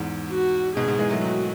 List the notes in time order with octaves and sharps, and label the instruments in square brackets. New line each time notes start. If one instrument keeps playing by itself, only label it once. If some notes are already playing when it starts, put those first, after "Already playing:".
Already playing: [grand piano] E2 G#2
[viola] F#4
[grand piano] G#2 B2 [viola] G#4
[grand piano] G#2 B2
E3 G#3
F#3 A3
[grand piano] D#3 F#3 [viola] F#4